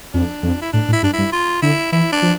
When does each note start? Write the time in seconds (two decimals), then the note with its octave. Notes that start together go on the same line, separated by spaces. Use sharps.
0.13 F2 D4
0.43 F2
0.62 E4
0.73 A2 D4
0.88 A2
0.93 E4
1.03 G2 D4
1.13 E4
1.18 G2
1.33 F4
1.62 D3 E4
1.92 E3 E4
2.12 D4
2.22 F3